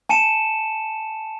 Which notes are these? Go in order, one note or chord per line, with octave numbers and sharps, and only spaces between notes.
G#5 A5 C#7 D#7 E7